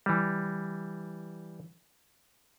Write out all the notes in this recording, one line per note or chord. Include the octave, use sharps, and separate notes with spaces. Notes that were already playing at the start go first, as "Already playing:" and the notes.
E3 G3